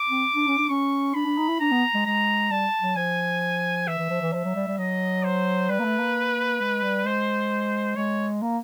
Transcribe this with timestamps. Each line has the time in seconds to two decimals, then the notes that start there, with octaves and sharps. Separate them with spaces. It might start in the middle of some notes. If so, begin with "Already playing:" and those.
Already playing: D6
0.09 C4
0.35 D4
0.47 C#4
0.58 D4
0.69 C#4 C#6
1.14 D4 B5
1.26 D4
1.38 D#4
1.49 E4
1.60 D4 A#5
1.71 B3
1.94 G#3
2.06 G#3 A#5
2.51 G3 A5
2.81 F#3
2.96 F3 G#5
3.87 E3 E5
3.98 E3
4.10 F3
4.22 E3
4.33 F3 E5
4.45 F#3
4.56 G3
4.67 G3
4.78 F#3 D#5
5.24 C5
5.69 G3 B4
5.80 A#3
5.85 A3
5.99 A#3
6.60 G#3
6.83 G3
7.05 G#3 C5
7.96 G#3 C#5
8.42 A#3